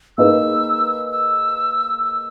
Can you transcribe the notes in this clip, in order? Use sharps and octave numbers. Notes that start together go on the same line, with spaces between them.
A#3 D#4 G#4 B4 E6
E6
E6